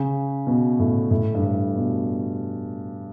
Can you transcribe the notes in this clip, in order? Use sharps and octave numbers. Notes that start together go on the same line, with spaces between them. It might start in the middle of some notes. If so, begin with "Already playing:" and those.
Already playing: C#3
B2
A2
A2
G2
A2
B2